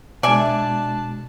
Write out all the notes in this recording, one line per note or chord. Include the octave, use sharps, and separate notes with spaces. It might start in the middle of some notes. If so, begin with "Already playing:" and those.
B2 G#3 D4 D5 E5 G#5 A5